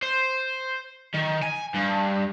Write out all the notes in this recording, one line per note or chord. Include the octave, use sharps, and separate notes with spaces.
C5
D#3
G#5
G2